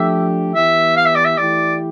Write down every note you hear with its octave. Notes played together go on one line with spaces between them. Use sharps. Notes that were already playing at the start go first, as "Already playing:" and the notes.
Already playing: F3 A3 D4 G4 E5
E3 B3 E4 G4 E5
F5
E5
D5
E5
E3 A3 E4 G4 D5